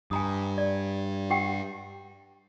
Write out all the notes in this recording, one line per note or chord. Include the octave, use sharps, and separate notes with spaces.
G2 G#5 A#5 D#6
D5
G4 F#5 G5